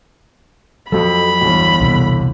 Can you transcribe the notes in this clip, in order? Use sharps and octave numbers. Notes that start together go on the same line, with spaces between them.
F2 F#3 A4 B5
G1 E2
C2 B2 D3